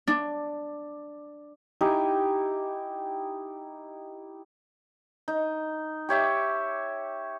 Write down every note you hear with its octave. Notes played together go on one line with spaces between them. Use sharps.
D4
D#4 E4 G4 G#5
D#4
G4 C#5 E5 D6